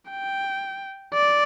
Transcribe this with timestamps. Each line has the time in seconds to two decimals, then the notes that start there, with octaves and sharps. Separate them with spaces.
0.10 G5
1.14 D5